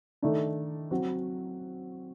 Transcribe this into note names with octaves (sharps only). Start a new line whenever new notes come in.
D#3 A3 D4
F#3 C4 F#4